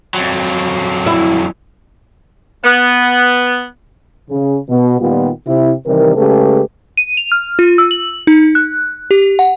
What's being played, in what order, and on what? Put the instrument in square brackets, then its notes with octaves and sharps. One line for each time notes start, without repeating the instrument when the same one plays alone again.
[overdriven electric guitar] F2 F#3
[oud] E4
[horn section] B3
[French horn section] C#3
B2
A#2 D#3 G3 B3 F4
C3 E4
C3 D#3 E3 G3 A#4
C#3 G#3 A3 G4 A4 B4
[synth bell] D#7
F7
F6
F4
E6
F#7
D#4
F#6
G4
F#5